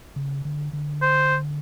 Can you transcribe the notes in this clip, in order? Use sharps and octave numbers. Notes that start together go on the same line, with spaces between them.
C#3
D3
D3
C5